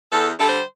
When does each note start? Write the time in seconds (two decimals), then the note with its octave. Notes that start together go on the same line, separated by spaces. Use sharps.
0.12 E2 A4
0.38 D3 G3 A4
0.48 C5